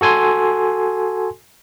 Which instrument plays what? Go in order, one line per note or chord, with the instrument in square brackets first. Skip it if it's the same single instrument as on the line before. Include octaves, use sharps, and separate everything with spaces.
[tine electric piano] F#4 A4 G#5 C6